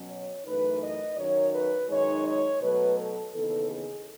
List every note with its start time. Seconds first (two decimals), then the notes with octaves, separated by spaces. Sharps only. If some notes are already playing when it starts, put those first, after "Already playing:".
Already playing: B2 F#3 C#4
0.10 C#5
0.46 F#2 E3 A3 D#4 B4
0.82 D#5
1.17 F#2 D#3 F#3 C#5
1.54 B4
1.89 F#2 D#3 G#3 D#4 C#5
2.25 C#5
2.61 B2 F#3 A3 B4
2.97 A4
3.33 D#2 C#3 E3 B3 D#4 A4
3.69 G#4